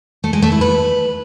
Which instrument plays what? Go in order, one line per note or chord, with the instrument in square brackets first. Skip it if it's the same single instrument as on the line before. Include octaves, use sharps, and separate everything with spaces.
[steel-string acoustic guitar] A3
G#3
A3
E4
B4